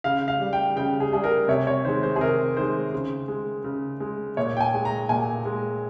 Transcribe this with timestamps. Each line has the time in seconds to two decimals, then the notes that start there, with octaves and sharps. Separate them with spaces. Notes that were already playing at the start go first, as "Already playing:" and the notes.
0.04 C#3 F5
0.28 F5
0.39 G3
0.53 G5
0.76 C#3 G5
1.00 G#4
1.12 G3 G#4
1.24 A#4
1.48 C3 C#5
1.67 C#5
1.85 D#3 G#3 C5
2.03 C5
2.16 G#4
2.20 C3 A#4
2.56 D#3 G#3 C5
2.93 C#3
3.28 G#3
3.64 C#3
4.00 G#3
4.37 A#2 C#5
4.57 G5
4.61 G#5
4.74 G#3
4.85 A#5
5.09 A#2 G#5
5.45 G#3